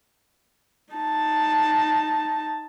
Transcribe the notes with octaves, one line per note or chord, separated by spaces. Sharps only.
D#4 A5